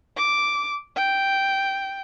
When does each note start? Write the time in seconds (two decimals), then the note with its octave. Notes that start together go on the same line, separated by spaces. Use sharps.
0.17 D6
0.96 G5